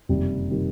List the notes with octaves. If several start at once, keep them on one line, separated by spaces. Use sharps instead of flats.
F#1 F2 C3 D#3 G3
C3 D#3 G3